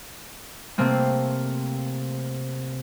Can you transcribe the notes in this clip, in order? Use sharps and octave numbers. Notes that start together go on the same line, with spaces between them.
C3 A3 A#3 C4